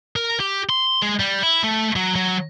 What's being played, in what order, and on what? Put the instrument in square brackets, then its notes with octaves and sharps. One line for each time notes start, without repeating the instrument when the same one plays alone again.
[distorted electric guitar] A#4
G4
C6
G#3
G3
E4
A3
F#3
F#3